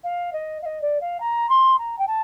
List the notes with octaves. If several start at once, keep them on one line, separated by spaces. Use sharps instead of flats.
F5
D#5
F5
D#5
D5
F5
A#5
C6
A#5
G5
A5